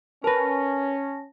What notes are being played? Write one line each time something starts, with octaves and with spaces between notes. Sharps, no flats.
C#4 A#4 B4 A5 A#6